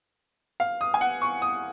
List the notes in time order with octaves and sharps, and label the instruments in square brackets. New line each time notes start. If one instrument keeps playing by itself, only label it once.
[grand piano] F5
D#6
G#5
F#5
C#6
D#6